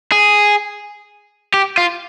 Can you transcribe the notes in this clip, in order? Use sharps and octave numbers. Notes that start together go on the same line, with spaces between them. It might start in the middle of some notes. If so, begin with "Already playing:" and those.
G#4
G4
F4